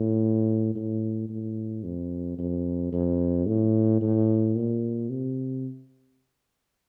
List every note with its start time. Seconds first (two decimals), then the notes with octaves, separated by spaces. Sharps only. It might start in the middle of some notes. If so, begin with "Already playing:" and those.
Already playing: A2
0.75 A2
1.29 A2
1.84 F2
2.39 F2
2.93 F2
3.47 A2
4.01 A2
4.55 A#2
5.10 C3